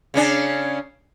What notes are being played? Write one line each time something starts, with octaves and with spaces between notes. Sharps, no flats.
C#3 C#4 D4